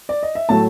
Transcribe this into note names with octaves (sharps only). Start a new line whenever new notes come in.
D5
D#5
E5
A2 F#3 A3 A5